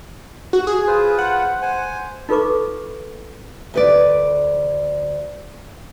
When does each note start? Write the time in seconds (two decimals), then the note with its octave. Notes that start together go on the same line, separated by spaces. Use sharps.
0.53 F#4
0.67 G#4
0.87 F4 B4 C5
1.19 F#5
1.62 C5 G#5
2.29 D#4 F4 A4 B4 C#6 D6
3.74 D2 B4 D5